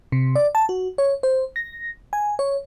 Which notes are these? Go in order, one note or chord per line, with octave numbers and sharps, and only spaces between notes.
C3
D5
A5
F#4
C#5
C5
A#6
G#5
C#5